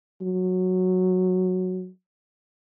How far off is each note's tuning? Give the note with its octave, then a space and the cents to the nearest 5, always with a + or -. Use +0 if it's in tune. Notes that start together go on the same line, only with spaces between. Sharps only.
F#3 -10